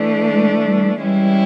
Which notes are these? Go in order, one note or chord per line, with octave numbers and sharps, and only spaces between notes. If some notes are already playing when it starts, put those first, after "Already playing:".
Already playing: E3 A3 D4
G#3
G3
E3 G3 G#3 C#4 E4 G4